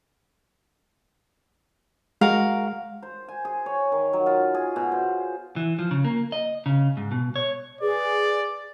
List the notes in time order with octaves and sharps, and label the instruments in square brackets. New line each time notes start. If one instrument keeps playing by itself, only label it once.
[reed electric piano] G#3 [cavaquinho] F#4 A#4 F5
[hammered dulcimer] C5
G#5
G#4
C#5
D#3
F#3
F4
G#4
B2
C5
[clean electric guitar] E3
F3
C#3
A#3
D#5
C#3
G#2
B2
C#5
[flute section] G#4 B4 [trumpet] D5